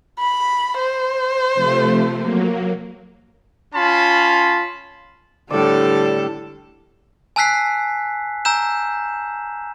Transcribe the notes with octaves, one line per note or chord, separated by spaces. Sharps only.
B5
C5
C3 F3 A3
F#3 A#3
C#4 F4 A5 B5 C6
A2 D3 G3 A4 D5
G#5 A5 E6 F#6 B6 C7
G#5 A#5 E6 G6 E7